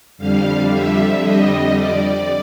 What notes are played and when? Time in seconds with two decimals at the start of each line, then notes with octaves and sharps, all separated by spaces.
0.18 F2 D3 G3 F5
0.71 E5
1.23 D#5
1.76 D5